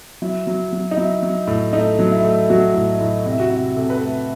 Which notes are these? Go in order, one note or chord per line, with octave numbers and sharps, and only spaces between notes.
F#3 E4
F#3
F#3
D#4
F#3 E4
F#3
A2
A3 D#4
F#3
E4
A3
F#3 F#4
A2
A2
C3 E4
F#4
C3 E4
C3 A4
B4
A3 A4